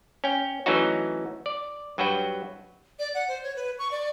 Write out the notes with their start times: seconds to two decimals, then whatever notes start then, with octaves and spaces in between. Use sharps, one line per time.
0.24 C#4 G5
0.66 E3 F#3 A3 C#4 D#4 F#4
1.46 D5
1.98 G2 F#3 F#4 B4 G5
2.99 D5
3.14 F#5
3.28 C5
3.43 C#5
3.56 B4
3.79 C#6
3.91 D5